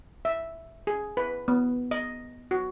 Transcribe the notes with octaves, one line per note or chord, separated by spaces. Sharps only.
E5
G#4
B4
B3
D#5
F#4